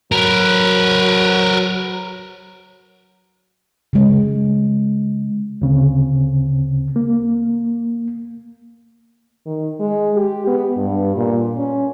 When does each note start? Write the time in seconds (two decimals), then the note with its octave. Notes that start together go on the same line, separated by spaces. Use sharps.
0.12 F#3 A#4 B4
3.93 C#3 G#3
5.62 D2 C#3 C4
6.96 A#3
9.46 D#3
9.79 G#3
10.16 G4
10.47 B3
10.77 G2
11.16 A#2
11.57 C#4